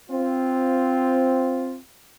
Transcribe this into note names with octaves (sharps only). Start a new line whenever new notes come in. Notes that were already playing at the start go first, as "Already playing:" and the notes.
C4 F4